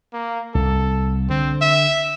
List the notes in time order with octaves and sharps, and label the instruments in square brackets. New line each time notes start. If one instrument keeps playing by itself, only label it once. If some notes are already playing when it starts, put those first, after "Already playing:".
[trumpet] A#3
[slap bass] C2 [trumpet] A4
[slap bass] D3 [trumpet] C4
[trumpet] E5